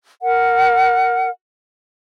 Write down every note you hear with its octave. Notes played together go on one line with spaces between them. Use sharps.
A#4 F#5